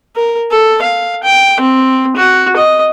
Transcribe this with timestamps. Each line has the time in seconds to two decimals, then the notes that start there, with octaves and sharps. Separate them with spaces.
0.16 A#4
0.51 A4
0.82 F5
1.23 G5
1.60 C4
2.16 F#4
2.56 D#5